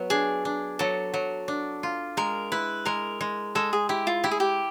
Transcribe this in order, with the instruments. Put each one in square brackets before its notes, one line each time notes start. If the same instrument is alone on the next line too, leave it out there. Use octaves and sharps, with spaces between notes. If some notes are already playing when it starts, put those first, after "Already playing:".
Already playing: [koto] F#3 B3
[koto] D4 [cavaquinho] G#4
[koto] D4
[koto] F#3 [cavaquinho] A4
[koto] F#3
D4
F4
[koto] G#3 [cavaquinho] A#4
[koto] E4 [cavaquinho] B4
[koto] G#3 [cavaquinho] A#4
[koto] G#3
[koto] G#3 [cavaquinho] A4
[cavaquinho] G#4
[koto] E4 [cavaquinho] G4
[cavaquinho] F4
[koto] E4 [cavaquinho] G4
[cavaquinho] G#4
G4